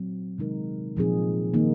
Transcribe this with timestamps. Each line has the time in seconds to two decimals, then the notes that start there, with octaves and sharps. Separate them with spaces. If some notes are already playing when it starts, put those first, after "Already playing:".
Already playing: A#2 F#3 C4
0.38 C3 D#3 G#3 D#4 A#4
0.97 A#2 F3 C4 D#4 G#4
1.54 D#3 A#3 D#4